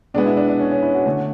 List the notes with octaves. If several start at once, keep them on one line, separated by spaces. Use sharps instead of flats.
B2 G#3 B3 D4
E4
D4
D4
C#4
C#4
E4
F#4
D3 A3 F#4